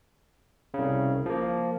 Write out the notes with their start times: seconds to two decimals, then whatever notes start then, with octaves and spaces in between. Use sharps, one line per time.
0.74 C2 C#3
1.26 F3 A#3